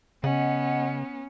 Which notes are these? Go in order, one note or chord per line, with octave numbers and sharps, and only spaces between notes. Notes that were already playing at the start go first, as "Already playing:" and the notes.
C#3 B3 C#4 D#5 F#5